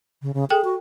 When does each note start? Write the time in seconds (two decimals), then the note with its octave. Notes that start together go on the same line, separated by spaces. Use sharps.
0.22 C#3
0.34 C#3
0.50 G#4 A4 G5
0.64 F#4